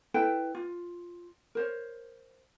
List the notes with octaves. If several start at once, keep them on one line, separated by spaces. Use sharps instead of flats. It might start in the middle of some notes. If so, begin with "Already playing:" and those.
E4 A4 B4 G5
F4
A#4 C5 C#5